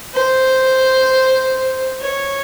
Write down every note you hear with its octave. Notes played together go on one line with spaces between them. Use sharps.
C5
C#5